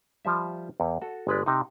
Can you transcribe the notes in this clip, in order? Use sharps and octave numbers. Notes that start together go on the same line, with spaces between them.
F3 G3 E5
E2
F#4 A4
G1 G#3 B4 D5
C3 D#4